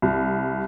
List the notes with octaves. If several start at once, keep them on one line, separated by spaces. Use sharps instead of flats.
C2